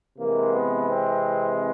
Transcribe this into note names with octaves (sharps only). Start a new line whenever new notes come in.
C3 E3 G#3 A#3
B3
C4